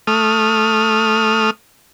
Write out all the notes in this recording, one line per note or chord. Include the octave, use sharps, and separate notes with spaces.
A3 D#6 F6